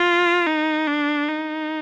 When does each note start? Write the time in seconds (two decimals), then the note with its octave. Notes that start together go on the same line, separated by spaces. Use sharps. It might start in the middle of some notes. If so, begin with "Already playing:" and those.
Already playing: F4
0.46 D#4
0.87 D4
1.29 D#4